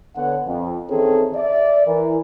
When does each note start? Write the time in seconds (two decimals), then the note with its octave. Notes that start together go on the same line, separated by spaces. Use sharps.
0.16 D3 B3 C#5 F#5
0.46 F2
0.90 D#3 E3 C4 C#4 G#4 A4
1.35 D5 E5
1.87 E3 E4 A#4